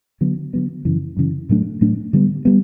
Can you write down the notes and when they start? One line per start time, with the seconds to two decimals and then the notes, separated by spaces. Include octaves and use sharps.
0.21 D3 F#3 B3
0.53 D3 F#3 B3
0.85 F#2 C#3 E3
1.17 F#2 C#3 E3
1.49 A2 F#3 A3 D4
1.81 A2 F#3 A3 D4
2.13 D3 G3 B3
2.45 G3 B3